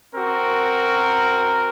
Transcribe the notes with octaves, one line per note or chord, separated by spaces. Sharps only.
C4 F#4 A#4